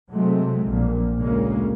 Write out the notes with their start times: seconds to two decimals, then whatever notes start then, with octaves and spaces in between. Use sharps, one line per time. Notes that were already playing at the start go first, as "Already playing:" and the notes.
0.10 C3 F#3 G#3 A3 C4
0.66 A#1 A#2
1.19 D2 C#3 G#3 A#3 C#4